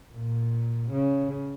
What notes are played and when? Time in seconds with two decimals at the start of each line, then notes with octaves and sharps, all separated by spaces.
0.16 A#2
0.93 C#3